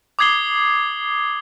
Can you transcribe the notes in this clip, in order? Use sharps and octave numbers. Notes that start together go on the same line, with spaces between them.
D6 D#6 G#6 C7 G7